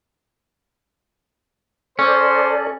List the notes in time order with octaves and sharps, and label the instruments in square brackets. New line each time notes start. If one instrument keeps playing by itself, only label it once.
[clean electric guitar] C#4 [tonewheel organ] A4 D5 [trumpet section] C5